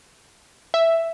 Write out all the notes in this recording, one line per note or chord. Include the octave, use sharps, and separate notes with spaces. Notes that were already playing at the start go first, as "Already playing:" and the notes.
E5